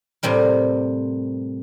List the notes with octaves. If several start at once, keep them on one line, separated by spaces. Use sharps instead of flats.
A2 C3 G3 A#4